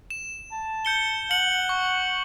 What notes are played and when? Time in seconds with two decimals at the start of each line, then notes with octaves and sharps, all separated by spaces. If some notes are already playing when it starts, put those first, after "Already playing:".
0.10 E7
0.52 A5
0.85 G6 C#7 G7
1.31 F#5 C#7 F#7
1.69 C#6